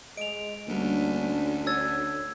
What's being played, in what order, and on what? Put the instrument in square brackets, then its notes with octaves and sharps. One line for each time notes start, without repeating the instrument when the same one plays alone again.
[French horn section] G#3 [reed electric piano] D#5 [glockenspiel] D7 F7
[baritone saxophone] D2 [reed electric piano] G3 A#3 [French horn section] C#4 D4
[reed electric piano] C#5 [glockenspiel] E6 G#6 A6